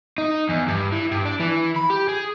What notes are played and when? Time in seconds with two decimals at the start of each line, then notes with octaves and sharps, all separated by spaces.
0.18 D#4
0.49 E2
0.68 G2
0.92 E3
1.11 G2
1.25 D4
1.40 E3
1.76 B5
1.90 G4
2.09 G#4